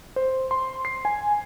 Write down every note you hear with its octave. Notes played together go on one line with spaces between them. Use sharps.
C5
C6
C7
G#5